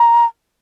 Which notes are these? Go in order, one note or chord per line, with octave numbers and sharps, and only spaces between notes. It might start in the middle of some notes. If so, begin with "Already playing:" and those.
Already playing: A#5